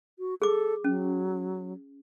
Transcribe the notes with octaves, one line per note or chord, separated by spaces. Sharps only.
F#4
G#4 A4 D6
F#3 C#4